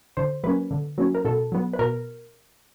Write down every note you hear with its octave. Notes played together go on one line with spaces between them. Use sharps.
D3 C5
F#3 A#3 C#4 B4
D3
F#3 A#3 C#4
A#4
B2 A4
F#3 B3
B4
B2 A#4